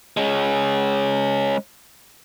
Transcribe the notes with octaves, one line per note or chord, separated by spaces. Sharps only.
G#3 C#4